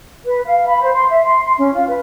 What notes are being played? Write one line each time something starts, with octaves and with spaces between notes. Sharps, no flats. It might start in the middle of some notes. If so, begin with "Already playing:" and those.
B4
F5
B5
C5
C6
E5
C6
C6
C#4
F4
B4